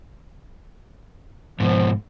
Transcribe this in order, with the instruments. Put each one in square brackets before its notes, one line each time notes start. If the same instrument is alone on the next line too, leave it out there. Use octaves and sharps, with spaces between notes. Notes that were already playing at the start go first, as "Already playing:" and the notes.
[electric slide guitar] G#2 B2 [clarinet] F3